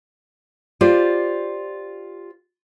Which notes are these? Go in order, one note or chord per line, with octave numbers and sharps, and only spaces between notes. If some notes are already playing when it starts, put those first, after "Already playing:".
F4 G4 C5 D5